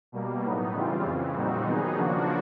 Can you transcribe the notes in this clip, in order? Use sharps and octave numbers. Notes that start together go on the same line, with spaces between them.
B2 G3 A#3
A2 F#3 B3 D#4
C#3 E3 G3 C4 F4
F2 C#3 E3
A#2 G3 C4 D#4 F#4
D#3 F#3 B3 D#4 G#4
C#3 F3 A#3 D4 F#4